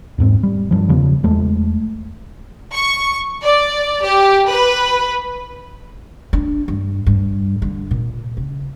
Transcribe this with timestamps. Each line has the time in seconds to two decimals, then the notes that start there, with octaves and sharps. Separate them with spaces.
0.18 E2 G#2 C4
0.43 G3
0.71 G2 F3
0.88 E2 C#3 F3 B3
1.24 E2 G#3 A3
2.73 C#6
3.43 D5
4.05 G4
4.49 B4
6.33 D4
6.68 G2
7.06 G2
7.62 D3
7.91 A#2
8.37 C#3